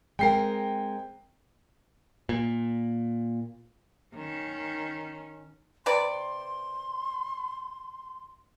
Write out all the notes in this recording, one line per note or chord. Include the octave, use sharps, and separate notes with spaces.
G#3 C4 A#4 G5 C7
A#2
D#3 C#4
C3 B4 D5 C6